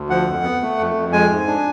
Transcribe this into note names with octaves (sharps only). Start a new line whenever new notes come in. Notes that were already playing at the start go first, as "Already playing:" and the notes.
Already playing: D2
F3 F#5
F2
B3
A3
F2
F2
G#3 G#5
G#2
D4